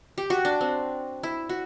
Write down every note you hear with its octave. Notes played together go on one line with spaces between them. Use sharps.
G4
F#4
D4
C4
E4
F#4